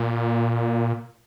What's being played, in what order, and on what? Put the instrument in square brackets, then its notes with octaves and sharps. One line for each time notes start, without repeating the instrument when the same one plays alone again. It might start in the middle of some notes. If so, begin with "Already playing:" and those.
Already playing: [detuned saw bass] A#2